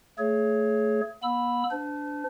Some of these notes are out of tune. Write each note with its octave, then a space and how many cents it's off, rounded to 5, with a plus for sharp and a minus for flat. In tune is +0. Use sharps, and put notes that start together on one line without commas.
A3 +15 G#4 +30 C#5 +0
B3 -45 B5 +0 E6 +0
D4 -10 C5 -45